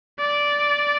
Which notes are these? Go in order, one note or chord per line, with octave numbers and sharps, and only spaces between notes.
D5